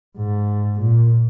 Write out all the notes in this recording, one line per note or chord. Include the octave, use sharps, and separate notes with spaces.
G#2
A#2